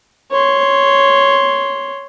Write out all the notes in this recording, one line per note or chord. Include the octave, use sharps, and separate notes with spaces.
C#5 C6